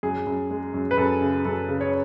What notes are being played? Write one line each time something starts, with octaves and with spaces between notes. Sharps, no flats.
F#2 G#4
F#2
G#3
F#2
B4
F#2 A4
C#3
F#2 A4
C#3
C#5